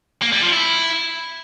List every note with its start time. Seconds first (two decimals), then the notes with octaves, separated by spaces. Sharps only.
0.22 A#3
0.32 G3
0.42 F3
0.53 E4